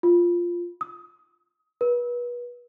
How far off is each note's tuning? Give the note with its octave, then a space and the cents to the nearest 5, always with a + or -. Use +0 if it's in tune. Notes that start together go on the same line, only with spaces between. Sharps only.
F4 +0
D#6 +25
B4 -30